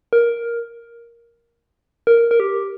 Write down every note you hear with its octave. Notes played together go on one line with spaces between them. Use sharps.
A#4
A#4
A#4
G4